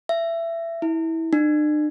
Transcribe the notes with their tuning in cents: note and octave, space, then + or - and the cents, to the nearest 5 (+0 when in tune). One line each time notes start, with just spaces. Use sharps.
E5 +20
E4 -20
D4 +45